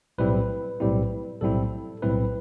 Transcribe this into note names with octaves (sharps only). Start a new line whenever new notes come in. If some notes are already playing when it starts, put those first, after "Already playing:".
B1 A2 G3 C4 E4 B4
B1 A2 G3 C4 E4
B1 A2 G3 C4 E4 A4
B1 A2 G3 C4 E4 B4